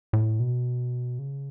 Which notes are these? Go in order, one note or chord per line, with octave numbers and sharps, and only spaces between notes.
A2
B2
C#3